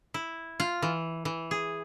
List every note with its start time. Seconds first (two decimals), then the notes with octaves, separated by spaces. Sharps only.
0.14 E4
0.60 F4
0.82 E3
1.25 E3
1.51 G#4